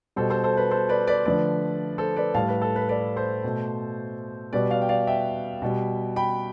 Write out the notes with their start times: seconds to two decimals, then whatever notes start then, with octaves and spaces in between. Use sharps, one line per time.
0.16 B2 G3 A4 C5
0.30 A4 C5
0.44 A4 C5
0.57 B4
0.71 A4 C5
0.89 B4 D5
1.07 B4 D5
1.25 D3 F3 A3 B4 D5
1.98 A4 C5
2.16 B4 D5
2.34 A2 G3 F5 A5
2.49 B4
2.62 A4
2.76 B4
2.89 B4 D5
3.16 A4 C5
3.44 B2 A3
4.53 B2 G3 B4 D5
4.71 D5 F5
4.82 G5
4.89 D5 F5
5.07 E5 G5
5.62 B2 G3
6.16 G5 B5